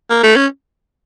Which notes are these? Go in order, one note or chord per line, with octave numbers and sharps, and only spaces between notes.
A#3
A3
C#4